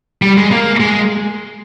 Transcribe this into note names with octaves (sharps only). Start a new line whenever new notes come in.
G3
G#3
A#3
G#3